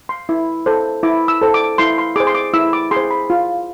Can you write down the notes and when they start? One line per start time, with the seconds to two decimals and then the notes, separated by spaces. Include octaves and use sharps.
0.09 C6
0.29 E4
0.66 A4 C5
1.03 E4 D6
1.28 E6
1.41 A4 C5
1.54 D6
1.78 E4 C6
1.98 C6
2.16 G#4 C5 D6
2.27 C6
2.35 D6
2.54 E4 E6
2.73 D6
2.91 G#4 C6
2.96 C5
3.11 B5
3.30 F4